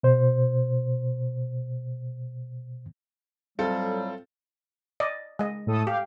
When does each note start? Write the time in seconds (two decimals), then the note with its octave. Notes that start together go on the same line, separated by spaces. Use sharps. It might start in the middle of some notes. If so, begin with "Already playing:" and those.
0.03 B2 C5
3.59 A2 F#3 G3 C4 F4 A4
5.00 D5 D#5
5.39 G#3 D#5
5.67 A2 A4 D#6
5.87 G4 F5 G5